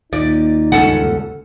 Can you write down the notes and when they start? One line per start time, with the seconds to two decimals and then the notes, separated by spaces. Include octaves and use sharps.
0.13 D#2 A#2 D#4 D5
0.72 G1 C#2 G#2 C#4 A4 F#5